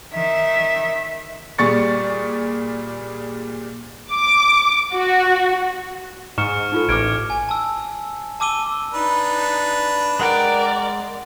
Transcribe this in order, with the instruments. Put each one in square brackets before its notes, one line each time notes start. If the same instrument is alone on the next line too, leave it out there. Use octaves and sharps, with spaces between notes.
[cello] D#3 E5
[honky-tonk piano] A#2 G3 G#4 C#6 A6 C#7
[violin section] D6
F#4
[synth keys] G#2 [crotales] C#6 F6 C#7 [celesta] E7
[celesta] D#4 F4 A4
[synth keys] A1 [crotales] D6 F6 G#6 [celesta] D7
[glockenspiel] G#5
A5 E6
A5 D6 E6 D#7 G7
[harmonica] D4 B4 [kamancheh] D#4
[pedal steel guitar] G#3 F#5 G5 [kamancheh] A#4 D5